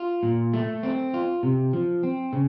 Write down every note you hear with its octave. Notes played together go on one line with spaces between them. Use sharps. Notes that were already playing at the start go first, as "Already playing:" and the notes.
Already playing: F4
A#2
A3
C4
F4
C3
F3
C4
C#3